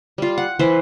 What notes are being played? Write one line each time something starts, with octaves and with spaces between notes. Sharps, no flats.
G3 F4
F#5
E3 B4 C5